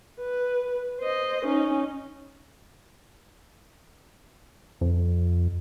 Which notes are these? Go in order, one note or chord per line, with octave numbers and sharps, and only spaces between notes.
B4
C5 D#5
C#4 D#4
F2